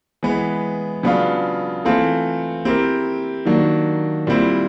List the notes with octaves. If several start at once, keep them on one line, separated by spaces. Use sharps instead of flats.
E3 G#3 B3
C#3 F#3 B3 D4 F4
E3 A3 C4 F4 A4
C4 E4 G4 A#4
D#3 F#3 A#3 D4
A#2 G3 C4 E4